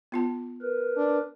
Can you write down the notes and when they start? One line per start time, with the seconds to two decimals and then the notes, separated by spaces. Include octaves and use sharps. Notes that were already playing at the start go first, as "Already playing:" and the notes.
0.12 B3 F4 A5
0.61 A#4 B4
0.97 D4